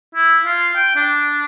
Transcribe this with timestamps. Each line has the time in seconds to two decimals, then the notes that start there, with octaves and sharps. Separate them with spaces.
0.15 E4
0.45 F4
0.75 G5
0.96 D4